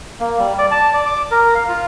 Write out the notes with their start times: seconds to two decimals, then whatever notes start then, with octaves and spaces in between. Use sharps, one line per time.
0.20 A#3
0.39 G3
0.58 D5
0.71 A5
0.94 D5
1.06 D6
1.31 A#4
1.55 F5
1.69 F4